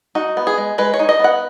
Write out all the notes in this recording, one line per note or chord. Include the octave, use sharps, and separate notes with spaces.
D#4 F#4
B3
G#4
G#3
G#3 B4
C#5
D#4
D#5
B3 F#5